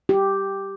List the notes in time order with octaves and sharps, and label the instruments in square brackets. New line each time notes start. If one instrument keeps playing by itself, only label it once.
[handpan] G4